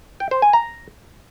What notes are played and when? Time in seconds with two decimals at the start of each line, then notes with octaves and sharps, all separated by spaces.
0.20 G5
0.31 C5
0.42 G#5
0.53 A#5